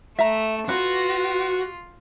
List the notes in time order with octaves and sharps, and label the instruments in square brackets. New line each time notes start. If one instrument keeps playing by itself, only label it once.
[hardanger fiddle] A3 [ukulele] E5 A#5
[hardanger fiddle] F4 [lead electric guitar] F#4 [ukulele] B4